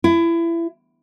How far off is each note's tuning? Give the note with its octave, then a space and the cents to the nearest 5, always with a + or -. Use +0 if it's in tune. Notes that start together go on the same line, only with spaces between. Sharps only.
E4 +25